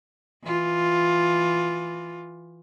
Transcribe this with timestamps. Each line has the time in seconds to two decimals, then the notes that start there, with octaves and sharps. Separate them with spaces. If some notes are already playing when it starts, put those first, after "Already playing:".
0.44 E3 F4